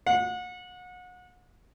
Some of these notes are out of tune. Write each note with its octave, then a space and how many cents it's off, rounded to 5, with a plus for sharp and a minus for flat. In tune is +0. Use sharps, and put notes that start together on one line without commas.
F#5 -35